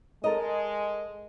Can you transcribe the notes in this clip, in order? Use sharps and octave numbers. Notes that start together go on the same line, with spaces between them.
G#3 A4 A#4 D#5